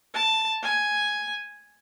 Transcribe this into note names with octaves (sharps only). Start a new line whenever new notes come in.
A5
G#5